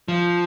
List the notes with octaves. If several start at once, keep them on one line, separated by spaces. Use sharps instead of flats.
F3